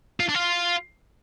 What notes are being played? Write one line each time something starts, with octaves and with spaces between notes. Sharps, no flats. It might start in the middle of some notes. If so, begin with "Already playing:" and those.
F4
D4
F4